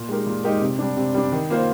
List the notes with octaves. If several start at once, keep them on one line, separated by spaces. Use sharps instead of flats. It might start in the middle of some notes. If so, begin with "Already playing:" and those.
Already playing: A#2
G#3 D#4 G4 A#4
A#2
G#3 D#4 G4 A#4
C3
G3 D4
C3
G3 D4
D#3
A#3 F4 C5